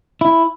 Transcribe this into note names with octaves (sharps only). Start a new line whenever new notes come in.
E4